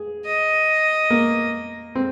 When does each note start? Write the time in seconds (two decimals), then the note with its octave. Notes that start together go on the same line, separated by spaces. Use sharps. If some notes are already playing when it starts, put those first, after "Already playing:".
Already playing: G#4
0.26 D#5
1.10 A#3
1.95 C4